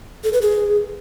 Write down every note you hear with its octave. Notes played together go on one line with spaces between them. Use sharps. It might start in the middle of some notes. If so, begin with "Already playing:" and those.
A4
B4
G#4